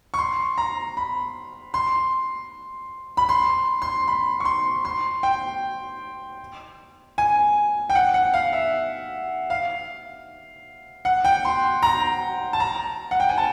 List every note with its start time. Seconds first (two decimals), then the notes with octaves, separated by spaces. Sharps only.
0.14 C#6
0.18 C6
0.58 A#5
0.97 B5
1.74 C6
3.17 B5
3.29 C6
3.82 C6
4.08 B5
4.40 C#6
4.45 C6
4.85 C6
5.23 G5
7.18 G#5
7.90 G5
7.95 F#5
8.14 F#5
8.34 F5
8.53 E5
9.50 F5
11.05 F#5
11.25 G5
11.45 C6
11.83 A#5
12.53 A5
12.60 A#5
13.11 F#5
13.20 G5
13.29 G#5
13.38 A5